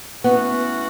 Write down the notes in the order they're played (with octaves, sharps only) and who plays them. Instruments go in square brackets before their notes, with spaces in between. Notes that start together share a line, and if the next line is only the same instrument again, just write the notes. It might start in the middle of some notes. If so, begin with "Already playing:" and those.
[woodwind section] E3 A3 C#4 F#4 [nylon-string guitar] B3